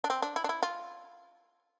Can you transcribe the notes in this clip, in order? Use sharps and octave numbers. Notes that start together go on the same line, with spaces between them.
D4
C4
D4
E4
D4
E4
F4